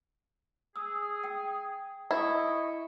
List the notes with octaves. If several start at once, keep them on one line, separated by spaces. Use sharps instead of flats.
G#4 D#6 E6
G5 D#6
E4 D#5 C#6